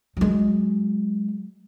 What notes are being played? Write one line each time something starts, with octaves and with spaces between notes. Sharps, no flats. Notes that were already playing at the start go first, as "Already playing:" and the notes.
F#3 G#3